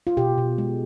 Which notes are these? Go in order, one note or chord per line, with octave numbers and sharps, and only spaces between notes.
F4
B2 G4
B2
G#3